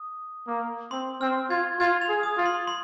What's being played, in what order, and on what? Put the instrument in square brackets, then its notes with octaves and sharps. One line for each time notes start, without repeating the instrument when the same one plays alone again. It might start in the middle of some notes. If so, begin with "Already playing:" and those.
Already playing: [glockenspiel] D#6
[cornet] A#3
[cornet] C4 [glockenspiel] C6
[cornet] C4 [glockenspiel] F6
[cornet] F4 [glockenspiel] G#6
[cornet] F4 [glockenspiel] G#6
[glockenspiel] F7
[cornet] G#4
[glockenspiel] D#6
[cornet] F4
[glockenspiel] C6
C6